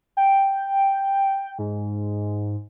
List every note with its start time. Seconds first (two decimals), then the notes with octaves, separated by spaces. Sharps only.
0.17 G5
1.59 G#2